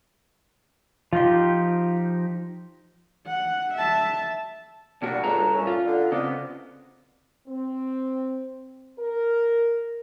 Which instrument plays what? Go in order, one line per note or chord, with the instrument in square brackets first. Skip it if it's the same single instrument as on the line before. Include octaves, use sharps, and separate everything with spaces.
[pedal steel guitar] F3 D#4 G4 [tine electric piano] F4 C6
[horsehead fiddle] F#5
E5 A5
[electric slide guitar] B2 A#3 F#4 [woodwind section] F#3 G3 D4
[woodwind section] C#2 [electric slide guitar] G2 A4 A#5
[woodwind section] A#2 A3 C#4
[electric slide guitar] F4
[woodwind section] D3
[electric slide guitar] C#3 B3 C4 [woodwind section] D5 D#5 F5
[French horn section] C4
A#4